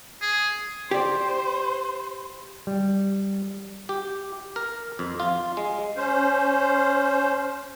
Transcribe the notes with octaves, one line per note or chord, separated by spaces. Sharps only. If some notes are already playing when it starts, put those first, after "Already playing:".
G#4
G4 C5 D5
G3
G4
A#4
F2
F4
G#3
C#4 C5